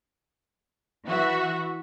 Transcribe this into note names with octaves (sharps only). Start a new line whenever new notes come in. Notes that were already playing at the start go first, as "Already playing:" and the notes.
E3 F#4 E5